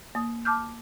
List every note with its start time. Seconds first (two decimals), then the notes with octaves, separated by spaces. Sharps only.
0.15 A#3 D#6
0.45 A5 D6 F6 G6